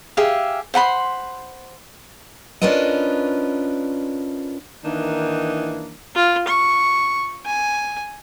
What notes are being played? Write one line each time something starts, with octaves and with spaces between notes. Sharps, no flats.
G4 G#4 E5 F5
C5 F#5 B5 C6
C#4 D4 F4 A#4 B4 D#5
D#3 E3 A#3 D4 D#4
F4
C#6
G#5